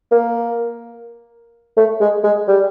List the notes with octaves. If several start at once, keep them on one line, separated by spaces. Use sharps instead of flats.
A#3
A3
G#3
G#3
G3